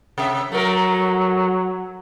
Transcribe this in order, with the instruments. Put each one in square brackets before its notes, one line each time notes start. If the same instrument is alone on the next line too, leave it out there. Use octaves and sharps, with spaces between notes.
[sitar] C3 E5
[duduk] F#3 [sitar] A3 A#4